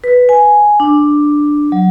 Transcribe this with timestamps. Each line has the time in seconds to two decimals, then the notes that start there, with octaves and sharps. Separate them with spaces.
0.04 B4
0.29 G#5
0.80 D4
1.72 F#3